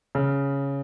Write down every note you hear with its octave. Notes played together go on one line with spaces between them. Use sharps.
C#3